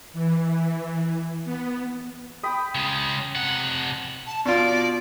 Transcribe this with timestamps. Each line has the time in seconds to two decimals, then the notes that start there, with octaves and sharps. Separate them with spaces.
0.13 E3
1.45 B3
2.43 G5 B5 D#6
2.75 C#3 G#3
3.35 C3 F#5
4.27 A5
4.45 B2 F4 D5